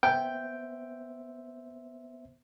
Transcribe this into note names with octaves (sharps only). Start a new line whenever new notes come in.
B3 C5 E5 G5